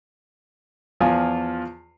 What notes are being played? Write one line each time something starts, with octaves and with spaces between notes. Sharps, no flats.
E2 F3 F4 G#5